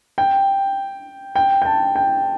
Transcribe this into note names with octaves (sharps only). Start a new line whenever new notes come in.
G5
G5
G5
A5
G5